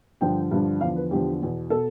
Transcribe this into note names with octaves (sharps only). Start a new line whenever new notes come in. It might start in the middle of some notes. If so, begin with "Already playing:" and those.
G2 D3 F3 G5
G2 D3 F3
E2 D3 F3 F5
B4
E2 D3 F3 G4
E2 B2
B2 A4